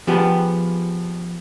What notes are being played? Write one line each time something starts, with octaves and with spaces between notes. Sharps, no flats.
F3 B3 G4 G#4